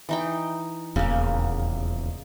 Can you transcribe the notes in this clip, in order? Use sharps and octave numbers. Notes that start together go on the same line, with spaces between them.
E3 D#4 G5
D#1 E2 C#3 A#3